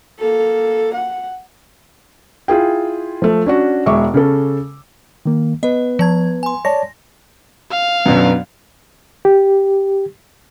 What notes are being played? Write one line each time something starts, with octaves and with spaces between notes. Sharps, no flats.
A#3 A4
F#5
E4 F4 G#4 G5
F3 A3
C#4 D4 F#4
E1 G#3 E5 C#6 D6
C#3 C#4 A4
D#3 A#3
B3 B4 D#5
F3 A5 G#6
G#5 C6
C#5 D5 A5 A#6
F5
F#2 B2 F#3 B3 D4
G4